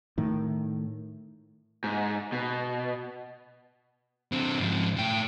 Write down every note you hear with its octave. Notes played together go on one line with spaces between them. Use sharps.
A2 D#3
G#2
B2
D3 C4
G#2 F3
A2 G5